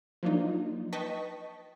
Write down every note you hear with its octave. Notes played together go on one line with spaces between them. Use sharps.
F3 F#3 A#3 D4 D#4 F4
B4 D#5 G5 A5 C#6 B6